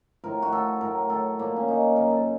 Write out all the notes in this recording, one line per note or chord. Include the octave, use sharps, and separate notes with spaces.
A2 F3 A#4
F#4
A4
A2 F#3 A#4
A4
A#2 F3 A#3
C#4
D#4
F#2 C#3 F3 A#4
A4